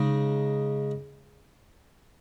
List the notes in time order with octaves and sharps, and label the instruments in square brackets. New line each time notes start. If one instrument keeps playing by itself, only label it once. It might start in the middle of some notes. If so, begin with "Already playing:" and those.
Already playing: [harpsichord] C#3 G#3 D#4